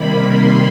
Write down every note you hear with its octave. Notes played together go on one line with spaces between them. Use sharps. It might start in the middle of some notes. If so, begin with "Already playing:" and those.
Already playing: C3 D#3 G3 A#3 B5
C6